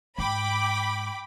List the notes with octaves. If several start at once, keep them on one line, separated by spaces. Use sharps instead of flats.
G#2 G5 B5 D6